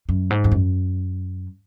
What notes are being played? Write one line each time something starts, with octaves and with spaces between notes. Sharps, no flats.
F#2
G#2
F2
F#2